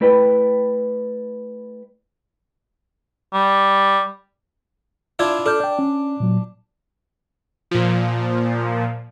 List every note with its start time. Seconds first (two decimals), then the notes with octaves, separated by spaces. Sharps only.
0.01 A3 E4 B4 D5 G5
3.33 G3
5.19 D4 E4 F4 E5 G#6
5.46 D4 A4 F6 G6
5.60 D5 G5
5.79 C#4
6.20 A#2 F#3
7.71 A#2 F3